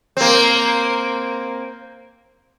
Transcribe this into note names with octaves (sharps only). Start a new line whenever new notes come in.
A#3 C4